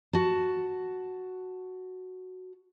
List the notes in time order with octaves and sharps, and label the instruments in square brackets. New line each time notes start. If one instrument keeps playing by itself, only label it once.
[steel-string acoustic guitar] F#4 A5